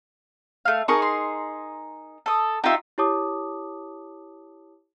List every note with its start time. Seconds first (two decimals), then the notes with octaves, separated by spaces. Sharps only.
0.65 A3 F5
0.88 D#4 G#4 A#4 C#6
1.02 C6
2.26 A4 D#6
2.64 D#4 F4 G4 E5
2.98 E4 G4 C#5 A5 D6 D#6